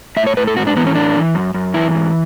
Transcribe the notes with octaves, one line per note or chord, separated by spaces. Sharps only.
A2 E5
C#5
A2 B4
A4
G#2 F#4
D4
E3 B3
C#4
A2 D4
E3
F#2
F#2
E3 E4
G#2